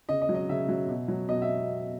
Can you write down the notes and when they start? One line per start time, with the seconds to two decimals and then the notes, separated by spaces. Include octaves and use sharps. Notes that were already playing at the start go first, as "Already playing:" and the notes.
0.09 C#3 D#5
0.22 D#5
0.29 F#3
0.35 D#5
0.49 C#3 E5
0.69 F#3
0.88 B2
1.08 F#3
1.29 B2 D#5
1.42 E5